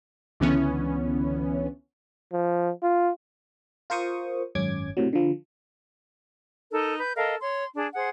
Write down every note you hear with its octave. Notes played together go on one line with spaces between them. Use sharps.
C#2 D3 E3 B3 C#4
F3
F4
F4 A#4 C5 C#6 D#6
G#1 F#2 C#4 D6 G#6
A2 C3 F#3
D3 F3
D#4 A4 A#4
B4 G6
A4 A#4 D#5 F5
C#5 C6
D4 G#4
G#4 C5 F#5